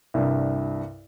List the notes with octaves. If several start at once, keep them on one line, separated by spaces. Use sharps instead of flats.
C2 G2